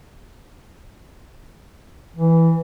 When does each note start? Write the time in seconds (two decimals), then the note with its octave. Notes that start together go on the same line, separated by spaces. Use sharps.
2.16 E3